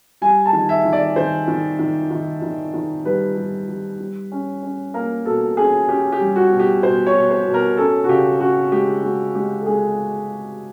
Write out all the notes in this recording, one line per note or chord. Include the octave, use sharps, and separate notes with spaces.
G3 G#5
A5
D#3
E5
D#3
D5
D#3 C5
D#3
D#3
D#3
D#3
D#3
G3 B4
G3
G3
G3
C#4
C#4
A#3 A#4
B2 A4
C#4 G#4
C#4 G4
G4
G3
F#4
B2
G4
B2 C5
C#5
B2
C5
B2
A#4
C#4 A4
F#4
C#3 G4
C#4 F#4
G#3 G4
G#3 F#4
G#3 G4
A4
G#3 G#4